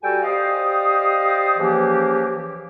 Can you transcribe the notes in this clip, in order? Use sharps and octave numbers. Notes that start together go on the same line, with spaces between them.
G3 F#4 A4 G5 G#5
G4 C5 D5 D#5 F5 D#6
C#3 E3 F3 A#3 C#4 G4